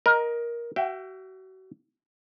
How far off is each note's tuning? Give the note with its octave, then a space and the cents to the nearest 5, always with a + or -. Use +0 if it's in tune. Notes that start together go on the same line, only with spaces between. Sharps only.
A#4 +15 D#5 +0
F#4 +35 E5 +30 G5 +0